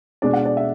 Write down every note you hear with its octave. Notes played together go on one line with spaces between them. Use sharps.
B2 G#3 D4 D5
F#5
D5
E5